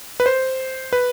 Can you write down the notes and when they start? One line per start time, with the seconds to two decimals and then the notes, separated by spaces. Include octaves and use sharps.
0.20 B4
0.26 C5
0.93 B4